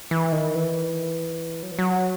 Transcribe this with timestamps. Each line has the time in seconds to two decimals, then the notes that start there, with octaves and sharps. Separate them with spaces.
0.11 E3
0.32 D#3
0.55 E3
1.63 F#3
1.72 E3
1.79 F#3